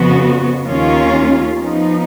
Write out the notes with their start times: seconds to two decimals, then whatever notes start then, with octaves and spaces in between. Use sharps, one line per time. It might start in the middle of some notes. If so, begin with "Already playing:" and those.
Already playing: F2 C#3 F3 B3 F#4
0.65 D#2 D#3 A#3 C#4 F4
1.58 F3 B3 D#4